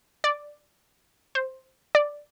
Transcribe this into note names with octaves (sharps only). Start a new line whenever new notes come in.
D5
C5
D5